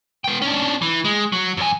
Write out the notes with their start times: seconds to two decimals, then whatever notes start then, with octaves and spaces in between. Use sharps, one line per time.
0.24 B3 G5
0.42 C#4 D4
0.82 E3
1.05 G#3
1.32 F#3
1.57 F#2 G#5